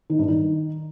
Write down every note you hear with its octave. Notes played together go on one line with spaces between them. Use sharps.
D#3
G2
D#3